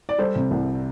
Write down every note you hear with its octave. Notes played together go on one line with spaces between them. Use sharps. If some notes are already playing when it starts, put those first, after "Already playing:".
D5
G3 A4 C5
C3
C2